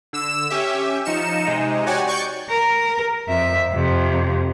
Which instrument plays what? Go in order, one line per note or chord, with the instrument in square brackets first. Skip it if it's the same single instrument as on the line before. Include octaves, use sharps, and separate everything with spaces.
[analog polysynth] D3 E6 E7
C#4 G4 E5
F3 D#4 C#7 E7
C3 G#3 D#4
F#4 G4 C#5 D5 F#5 G#5
D5 C#6 G6
[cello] A#4
F2 E5
F2 C3